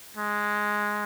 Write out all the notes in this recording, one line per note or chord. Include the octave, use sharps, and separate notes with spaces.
G#3